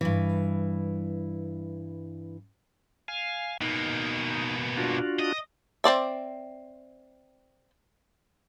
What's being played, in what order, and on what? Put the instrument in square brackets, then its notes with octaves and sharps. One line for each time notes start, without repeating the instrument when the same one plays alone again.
[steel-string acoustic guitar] G2 E3
[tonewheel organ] F5 G#5
[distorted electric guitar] B2 A#3 [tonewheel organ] D#4
[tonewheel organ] D4 F4 F#4
[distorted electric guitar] D#5
[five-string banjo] C4 C5 D5 E5